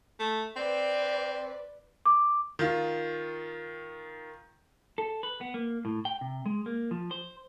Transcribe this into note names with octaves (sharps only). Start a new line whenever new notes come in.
A3
C4 B4 D5
D6
D#3 F4
A4
B4
B3
A#3
A2
G5
C3
G#3
A#3
F3
C5